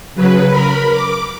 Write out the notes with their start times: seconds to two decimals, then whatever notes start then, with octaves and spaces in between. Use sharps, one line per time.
0.15 C#3 F#3 B4
0.48 A#4 B5
0.92 D6